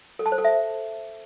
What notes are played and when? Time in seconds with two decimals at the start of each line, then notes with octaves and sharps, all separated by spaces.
0.19 A4
0.26 A5
0.32 C5
0.38 A4
0.45 E5